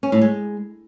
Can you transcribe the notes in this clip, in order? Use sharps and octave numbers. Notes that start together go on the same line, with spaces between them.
C#4
A2
G#3